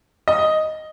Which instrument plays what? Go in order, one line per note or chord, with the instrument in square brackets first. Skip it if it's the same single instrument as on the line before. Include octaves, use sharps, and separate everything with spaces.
[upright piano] D#5